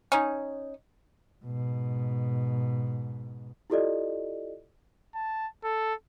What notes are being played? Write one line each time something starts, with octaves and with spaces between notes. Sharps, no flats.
C#4 D#4
G#2 B2
E4 F4 G4 A4 D5 D#5
A5
A4